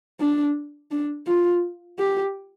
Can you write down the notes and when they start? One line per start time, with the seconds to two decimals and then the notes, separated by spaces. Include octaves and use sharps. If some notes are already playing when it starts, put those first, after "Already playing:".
0.20 D4
0.91 D4
1.27 F4
1.99 G4